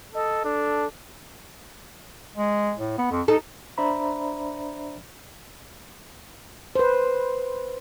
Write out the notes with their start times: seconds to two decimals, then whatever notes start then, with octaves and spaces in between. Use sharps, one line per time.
0.14 A4 D#5
0.45 D4 A4
2.36 G#3
2.78 A2
2.98 B3
3.11 F2
3.28 D#4 A4
3.78 D4 C5 D5 E5 A#5 B5
6.75 B4 C5